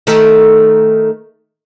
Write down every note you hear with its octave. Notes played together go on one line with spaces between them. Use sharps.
D#3 A3 A4